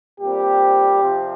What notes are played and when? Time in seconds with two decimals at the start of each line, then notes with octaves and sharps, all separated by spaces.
0.20 A#2 G3 C4 G4
1.01 C3 F3 C4